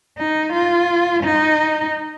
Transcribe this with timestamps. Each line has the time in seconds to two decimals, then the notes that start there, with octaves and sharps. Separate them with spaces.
0.18 D#4
0.53 F4
1.24 D#4